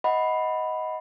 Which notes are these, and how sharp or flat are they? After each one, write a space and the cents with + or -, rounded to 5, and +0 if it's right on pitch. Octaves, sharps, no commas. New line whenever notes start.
D#5 +20 F#5 +0 B5 +0